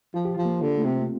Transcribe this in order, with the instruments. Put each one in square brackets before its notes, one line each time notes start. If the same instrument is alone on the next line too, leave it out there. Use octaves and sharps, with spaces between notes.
[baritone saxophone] F3 [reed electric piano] F4
[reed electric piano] G4
F4
[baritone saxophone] F3
[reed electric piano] A#3
[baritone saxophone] D3
[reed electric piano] A3
[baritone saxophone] C3
[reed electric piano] C4